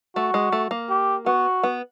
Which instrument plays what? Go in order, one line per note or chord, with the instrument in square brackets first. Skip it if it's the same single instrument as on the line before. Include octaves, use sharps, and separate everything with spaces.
[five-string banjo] A3 [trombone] F#4
[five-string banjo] G#3
A3
A#3
[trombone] G4
[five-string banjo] B3 [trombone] F#4
[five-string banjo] B3